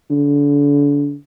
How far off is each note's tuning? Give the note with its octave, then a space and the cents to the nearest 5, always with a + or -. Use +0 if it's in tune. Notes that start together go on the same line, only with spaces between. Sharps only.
D3 -35